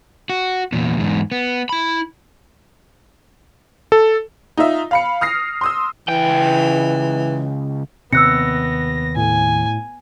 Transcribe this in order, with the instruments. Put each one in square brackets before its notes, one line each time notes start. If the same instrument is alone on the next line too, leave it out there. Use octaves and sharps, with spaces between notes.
[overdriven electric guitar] F#4
E2 A#2
E2 G#2
B3
E4 B5
[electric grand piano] A4
[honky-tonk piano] D#4 F4 E5
F5 B5 C#7
D#6 F6 A#6 C7
C6 D#6 E6
[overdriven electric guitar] C#2 G5 [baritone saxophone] E3
[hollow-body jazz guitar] D#2 C3 [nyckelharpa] B3 [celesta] E6 F#6 C#7 [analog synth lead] A#6
[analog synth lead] A2 [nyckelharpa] G#5